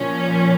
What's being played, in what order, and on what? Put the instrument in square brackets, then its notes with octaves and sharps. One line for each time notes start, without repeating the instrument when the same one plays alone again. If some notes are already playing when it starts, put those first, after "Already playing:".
Already playing: [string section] A#2 F3 C#4